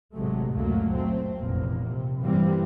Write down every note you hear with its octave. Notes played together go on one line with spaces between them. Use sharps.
G#1 A2 C3 F#3 G#3 A3
C#2 F#2 A#2 F#3 A3 A#3
F#1 A3 C4
F1 A#1 E2 A#3
C3
G2 E3 G3 A#3 C4